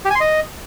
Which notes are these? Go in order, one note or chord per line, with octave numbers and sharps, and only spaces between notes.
G4
G#5
C6
D#5